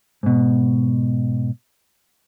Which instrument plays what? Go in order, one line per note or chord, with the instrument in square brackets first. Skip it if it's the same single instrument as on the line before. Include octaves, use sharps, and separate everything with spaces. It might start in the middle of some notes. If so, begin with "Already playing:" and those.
[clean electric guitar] G#2 B2